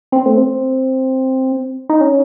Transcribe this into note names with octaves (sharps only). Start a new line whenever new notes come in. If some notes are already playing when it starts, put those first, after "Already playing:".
C4
A3
C4
D#4
C#4